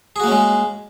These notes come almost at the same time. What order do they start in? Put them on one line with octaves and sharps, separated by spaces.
G#4 F#4 A#3 C#4 G#3